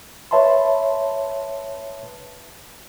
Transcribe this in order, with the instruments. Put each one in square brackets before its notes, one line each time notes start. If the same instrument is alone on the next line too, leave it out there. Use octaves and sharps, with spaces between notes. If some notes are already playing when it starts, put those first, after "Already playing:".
[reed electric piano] B4 C#5 E5 A5 B5 C6